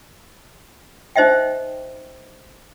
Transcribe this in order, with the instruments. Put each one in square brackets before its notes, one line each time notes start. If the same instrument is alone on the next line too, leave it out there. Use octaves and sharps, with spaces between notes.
[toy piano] D#4 C5 D#5 E5 G5